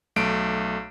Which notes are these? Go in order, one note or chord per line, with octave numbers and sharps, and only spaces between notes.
B1 A3 D7